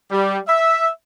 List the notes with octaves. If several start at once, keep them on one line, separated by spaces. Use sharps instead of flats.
G3
E5